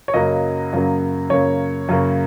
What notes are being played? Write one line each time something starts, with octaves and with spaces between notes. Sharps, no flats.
C#5
F#2 C#3 F#3 A#3 D#5
F#2 C#3 F#3 A#3
F#2 C#3 A#3 C#5
F#2 C#3 A#3